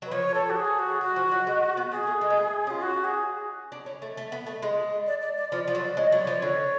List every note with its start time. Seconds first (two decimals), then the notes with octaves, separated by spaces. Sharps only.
0.02 F#3 B4
0.11 F3 C#5
0.34 A4
0.50 F#4
0.56 G#4
0.79 F#4
1.01 F#3 F#4
1.16 F3
1.31 F#3
1.47 G#3
1.77 B3
1.92 B3 G#4
2.07 A3
2.21 G#3
2.30 B3
2.37 A3
2.67 C#4 F4
2.82 F#4
3.04 G#4
3.72 D4
3.86 C#4
4.02 A3
4.17 A3
4.32 B3
4.46 A3
4.62 G#3
5.07 D5
5.22 D5
5.37 D5
5.52 F3 D5
5.67 F3 D5
5.75 F#3
5.97 G#3 C#5
6.12 F#3
6.20 D5
6.27 F3
6.42 D3 C#5